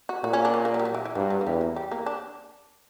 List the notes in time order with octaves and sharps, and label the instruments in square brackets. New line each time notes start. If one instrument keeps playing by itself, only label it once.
[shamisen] F#4
[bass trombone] A#2 [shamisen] F#4
[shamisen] C#4
D4
C#4
A#3
F#3
G3
F#3
E3
E3
[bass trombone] G2 [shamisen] F#3
[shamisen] F#3
A#3
[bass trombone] E2 [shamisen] G3
[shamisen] A#3
G3
A#3
D4